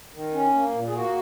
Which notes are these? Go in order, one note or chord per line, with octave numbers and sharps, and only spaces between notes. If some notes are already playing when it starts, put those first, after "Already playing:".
D#3
C#4
A#3
A#2
G#4
A#3 F#4